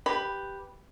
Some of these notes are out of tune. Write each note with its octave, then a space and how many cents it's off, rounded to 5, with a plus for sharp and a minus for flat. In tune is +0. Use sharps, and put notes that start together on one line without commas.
G4 +0 B4 +0 B5 +0